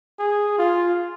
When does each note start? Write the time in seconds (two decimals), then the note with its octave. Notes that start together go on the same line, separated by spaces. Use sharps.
0.19 G#4
0.58 F4